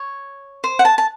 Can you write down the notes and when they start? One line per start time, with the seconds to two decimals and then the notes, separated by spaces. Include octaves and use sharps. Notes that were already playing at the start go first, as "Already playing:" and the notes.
Already playing: C#5
0.64 C5
0.79 F#5
0.85 A5
0.98 A5